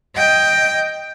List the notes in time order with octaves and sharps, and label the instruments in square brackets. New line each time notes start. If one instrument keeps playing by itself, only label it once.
[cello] D#5 G5